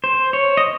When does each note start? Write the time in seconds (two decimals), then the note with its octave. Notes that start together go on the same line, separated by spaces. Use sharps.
0.04 C5
0.33 C#5
0.57 D#5